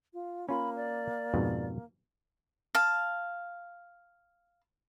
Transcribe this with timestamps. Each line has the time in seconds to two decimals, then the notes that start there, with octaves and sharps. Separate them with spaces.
0.13 F4
0.49 A#3 C#4 F4 B5
0.76 D5
1.34 F2 G#2 B2
2.75 F5 A5